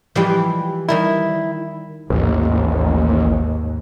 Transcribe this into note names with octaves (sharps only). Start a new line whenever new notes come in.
E3 F3 G3 G#3 F4 G4
D#3 G3 E4 A#4
A1 D#2 G#2